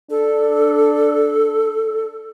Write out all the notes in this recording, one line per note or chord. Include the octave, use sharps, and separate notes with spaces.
D4 A4